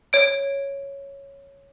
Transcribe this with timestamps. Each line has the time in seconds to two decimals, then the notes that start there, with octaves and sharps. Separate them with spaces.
0.13 C#5 D7